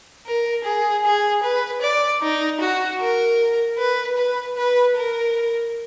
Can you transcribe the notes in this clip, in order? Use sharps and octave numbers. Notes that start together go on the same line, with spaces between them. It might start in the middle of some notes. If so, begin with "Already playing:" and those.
A#4
G#4
G#4
B4
D5
D#4
F#4
A#4
B4
B4
B4
A#4